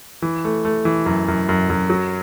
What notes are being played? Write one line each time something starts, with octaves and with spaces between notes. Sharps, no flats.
E3
A3
A3
E3
F#2
F#2
F#2
F#2
F#3